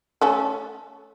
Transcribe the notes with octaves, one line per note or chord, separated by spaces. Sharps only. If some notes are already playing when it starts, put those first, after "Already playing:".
A3 C#4 A4